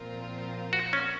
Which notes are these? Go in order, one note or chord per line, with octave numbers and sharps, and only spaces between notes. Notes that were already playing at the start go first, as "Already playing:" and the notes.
Already playing: A#2 F3 C4 F4 A#4
F#4
C#4